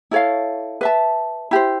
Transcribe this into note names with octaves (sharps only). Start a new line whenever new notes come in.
E4 A4 C#5 F5
B4 E5 A5
E4 G4 C5